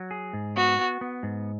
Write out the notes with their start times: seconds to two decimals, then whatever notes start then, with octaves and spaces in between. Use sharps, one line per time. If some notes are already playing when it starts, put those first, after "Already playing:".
Already playing: F#3
0.11 G#4
0.33 G#2
0.56 B3 F#4
0.79 B3
1.01 B3
1.23 G#2